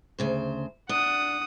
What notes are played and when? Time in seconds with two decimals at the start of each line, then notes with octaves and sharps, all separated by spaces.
0.19 D2 C#3 C5
0.89 D4 F#5 D#6